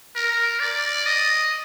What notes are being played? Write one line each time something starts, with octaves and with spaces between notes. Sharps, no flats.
A#4
D5
D#5